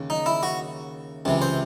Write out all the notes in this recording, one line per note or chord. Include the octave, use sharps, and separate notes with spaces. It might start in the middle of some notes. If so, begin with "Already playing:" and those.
Already playing: D#2 C#3
D#4
E4
F#4
C#2 C3 E3
C5